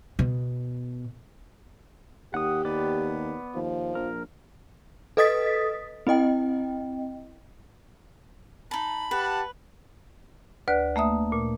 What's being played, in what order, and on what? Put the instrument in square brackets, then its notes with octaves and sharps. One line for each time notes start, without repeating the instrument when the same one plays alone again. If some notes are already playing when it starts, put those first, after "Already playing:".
[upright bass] B2
[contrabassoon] D#2 [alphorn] G4 [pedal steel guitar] F#5 D#6
[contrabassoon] D#2 [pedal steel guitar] B3 B4 D5
[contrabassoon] D#2 [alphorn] F3
[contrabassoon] A#1 [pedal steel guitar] A#4
[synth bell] A4 B4 D#5 D#6 A6 B6
C4 E4 D#5 G5
[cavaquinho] D#4 A5 [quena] B5
[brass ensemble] G4 F#5 A5 [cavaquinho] B4
[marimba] D2 B4 D5 F#6
A3 A#3 E5 D#6
A#2